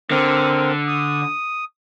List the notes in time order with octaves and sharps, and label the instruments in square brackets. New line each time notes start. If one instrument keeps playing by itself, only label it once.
[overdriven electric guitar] D3 [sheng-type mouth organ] C4 A#4
[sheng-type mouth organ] D#6